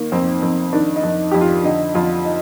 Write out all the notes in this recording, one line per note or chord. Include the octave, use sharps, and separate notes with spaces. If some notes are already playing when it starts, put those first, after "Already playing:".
Already playing: D#3 A#3
F2 C4
F2 C4
D#3 D4
D#4
F2
F2 G4
F4
D3 D#4
F2 F4
D#4